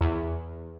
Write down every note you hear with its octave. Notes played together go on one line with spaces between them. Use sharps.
E2